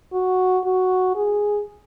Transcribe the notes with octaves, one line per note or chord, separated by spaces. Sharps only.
F#4
F#4
G#4